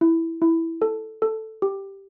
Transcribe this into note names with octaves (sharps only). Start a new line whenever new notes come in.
E4
E4
A4
A4
G4